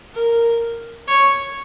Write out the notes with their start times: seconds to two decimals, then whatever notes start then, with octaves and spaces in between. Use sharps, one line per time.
0.14 A#4
1.07 C#5